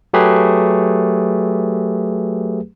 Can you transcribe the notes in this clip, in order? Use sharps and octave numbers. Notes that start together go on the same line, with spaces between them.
F#3 A3 G4 G#4 B4